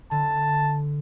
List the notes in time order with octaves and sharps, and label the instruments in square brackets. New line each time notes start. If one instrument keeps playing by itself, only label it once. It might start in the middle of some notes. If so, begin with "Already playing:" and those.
[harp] D3 [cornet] A5